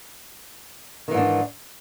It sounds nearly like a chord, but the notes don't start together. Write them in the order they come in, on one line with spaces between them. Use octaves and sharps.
D#3 E3 G#2 D4